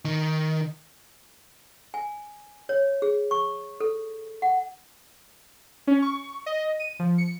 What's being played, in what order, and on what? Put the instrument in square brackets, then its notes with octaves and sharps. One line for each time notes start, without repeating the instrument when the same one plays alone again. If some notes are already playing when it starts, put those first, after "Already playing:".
[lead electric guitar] D#3
[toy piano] G#5
C#5
G#4
C#6
A4
F#5
[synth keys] C#4
C#6
D#5
D#7
F3
C#7